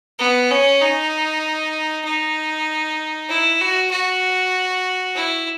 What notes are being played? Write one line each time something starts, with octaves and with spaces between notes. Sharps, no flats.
B3
C#4
D#4
D#4
E4
F#4
F#4
E4